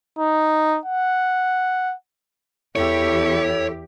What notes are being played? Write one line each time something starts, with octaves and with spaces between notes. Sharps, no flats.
D#4
F#5
E2 E4 G4 A4 C#5